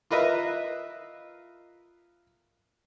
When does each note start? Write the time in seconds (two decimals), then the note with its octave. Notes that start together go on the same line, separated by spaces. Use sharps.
0.11 F4 A#4 B4 D#5 E5